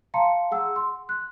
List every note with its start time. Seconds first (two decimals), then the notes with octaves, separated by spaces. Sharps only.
0.14 F5 A5 A#5 C6 C#7
0.51 G#4 F#5 E6
0.76 C6
1.09 F#6